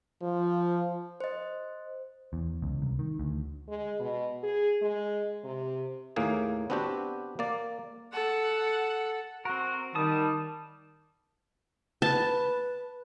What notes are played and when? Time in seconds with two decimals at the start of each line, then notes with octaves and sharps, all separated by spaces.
0.22 F3
1.20 C5 D#5
2.33 E2
2.62 C#2
2.82 C2
2.99 D#3
3.20 D2
3.68 G#3
4.00 B2
4.43 G#4
4.82 G#3
5.44 C3
6.16 D#2 A2 A#3 G#4
6.70 B3 C4 D4 F#4 G4
7.39 A#3 D5
8.12 A4 F#5
9.45 C4 F#4 A#4
9.95 D#3 G3 A5 D#6
12.02 B4 A5